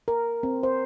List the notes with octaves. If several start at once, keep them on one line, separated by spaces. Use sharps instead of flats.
A#4
C4
C5